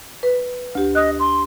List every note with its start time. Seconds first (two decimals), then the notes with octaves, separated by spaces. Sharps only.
0.23 B4
0.75 D2 G4
0.95 D#5 D#6 F#6
1.20 C6